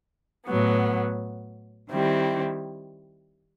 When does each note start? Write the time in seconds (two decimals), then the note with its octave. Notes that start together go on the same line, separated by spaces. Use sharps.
0.47 A2 F#3 B3
1.90 D#3 G3 C4 E4